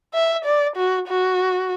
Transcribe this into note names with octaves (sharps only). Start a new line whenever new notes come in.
E5
D5
F#4
F#4